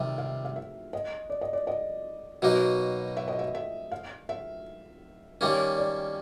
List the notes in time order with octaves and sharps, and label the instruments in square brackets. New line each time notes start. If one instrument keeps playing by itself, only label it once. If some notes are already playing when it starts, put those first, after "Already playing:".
Already playing: [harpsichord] C3 D#3 G3 [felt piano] E5
[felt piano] F5
F5
E5
D#5
D5
D#5
D5
D#5
[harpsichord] B2 F#3 A#3 D#4
[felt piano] E5
D#5
E5
E5
F5
E5
[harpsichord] D#3 G3 A#3 C#4 [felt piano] C#5
[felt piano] D5